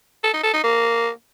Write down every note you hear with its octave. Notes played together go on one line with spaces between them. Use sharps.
A4
D#4
A4
D#4
A#3